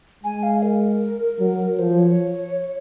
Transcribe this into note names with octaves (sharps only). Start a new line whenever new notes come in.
G#3 G#5
F5
A#4
F#3
F3 C5
C#5